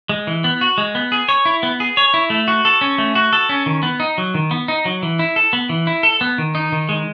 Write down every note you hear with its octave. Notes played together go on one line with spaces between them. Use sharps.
G#3
E3
B3
F#4
G#3
B3
G#4
C#5
E4
B3
G#4
C#5
E4
A3
F#4
A4
C#4
A3
F#4
A4
C#4
D#3
B3
D#4
F#3
D#3
B3
D#4
F#3
E3
E4
A4
B3
E3
E4
A4
B3
D#3
D#4
D#3
G#3